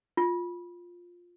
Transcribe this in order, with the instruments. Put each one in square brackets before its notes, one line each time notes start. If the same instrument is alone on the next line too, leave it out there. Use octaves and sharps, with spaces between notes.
[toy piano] F4